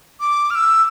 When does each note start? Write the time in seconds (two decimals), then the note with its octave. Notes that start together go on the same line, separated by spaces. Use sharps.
0.20 D6
0.50 F6
0.55 E6